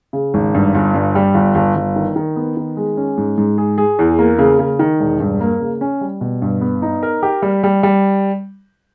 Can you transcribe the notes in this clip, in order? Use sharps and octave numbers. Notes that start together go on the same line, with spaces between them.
C#3
G#1
G2
G1
G2
G3
G1
G1
G1
D#3
D#3
B3
D#3
G#3
C#4
G#2
G#2
G#4
G#4
E2
A#3
C#3
C#3
D#3
E1
G2
A#3
C#3
C#4
G3
B2
G2
B3
D#4
A#4
G4
G3
G3
G3